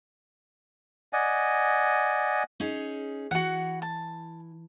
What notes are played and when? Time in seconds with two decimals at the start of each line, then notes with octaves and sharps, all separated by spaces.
1.13 D5 D#5 F#5 G#5
2.60 C#4 D#4 G#4
3.31 E3 F#4 F#5
3.82 A5